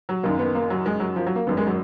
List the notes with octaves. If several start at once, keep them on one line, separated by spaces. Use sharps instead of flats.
F#3
F#1 F#2 D#3 A#3
B3
A#3
F#3
G#3
F#3
F3
F#3
A#3
G#1 F#2 D#3 B3
G#3
F#3